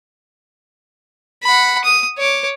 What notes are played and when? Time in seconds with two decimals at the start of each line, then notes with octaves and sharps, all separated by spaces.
1.44 F#5 B5
1.84 D#6
2.18 C#5 D6